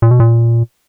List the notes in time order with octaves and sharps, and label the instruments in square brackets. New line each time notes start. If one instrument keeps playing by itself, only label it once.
[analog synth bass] A#2
B2
A#2